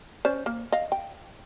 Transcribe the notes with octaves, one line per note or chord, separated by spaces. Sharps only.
C#4 C5 D5
A#3
D#5 F5
G5